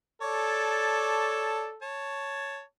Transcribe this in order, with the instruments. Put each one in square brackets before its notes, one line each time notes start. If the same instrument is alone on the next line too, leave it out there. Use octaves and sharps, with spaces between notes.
[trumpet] A4 [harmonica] C#5 D5 A5
[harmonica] C#5 A5